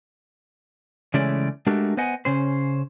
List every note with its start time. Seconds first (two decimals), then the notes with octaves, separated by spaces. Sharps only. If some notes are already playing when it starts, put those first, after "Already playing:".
1.14 C#3 E3 G#3 A3 C#4 D5
1.67 G#3 A3 D4 F#4 G4 A#4
1.97 B3 B4 C5 D#5 F#5 G#5
2.25 C#3 C#4 C5